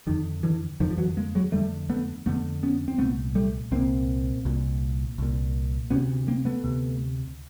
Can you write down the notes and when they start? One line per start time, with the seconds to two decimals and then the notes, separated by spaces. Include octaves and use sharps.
0.07 F2 D3 D#3
0.43 D3 E3
0.80 F2 D3 D#3 F3
0.91 F3
0.98 E3 F#3
1.17 G#3 A#3
1.35 F#3 G#3
1.52 F2 D3 G3 A3
1.89 A3 B3
2.26 F2 D3 A3 B3
2.63 B3 C#4
2.88 C4
2.98 C2 A#2 A3 B3
3.35 G3 A3
3.71 C2 A#2 A#3 C4
4.45 C2 A#2
5.18 C2 A#2
5.90 D2 C3 B3 C#4
6.28 A#3 C4
6.45 A3 B3
6.64 D2 C3